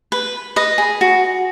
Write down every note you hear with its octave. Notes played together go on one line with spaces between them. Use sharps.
B4
B4 D#5
G#4
F#4